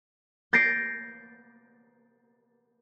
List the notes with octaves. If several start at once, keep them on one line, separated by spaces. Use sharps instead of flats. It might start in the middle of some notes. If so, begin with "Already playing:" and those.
G6 A6 A#6 C7 D7